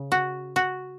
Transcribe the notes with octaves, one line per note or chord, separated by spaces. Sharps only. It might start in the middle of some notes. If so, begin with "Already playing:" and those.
Already playing: C#3
F#4
F#4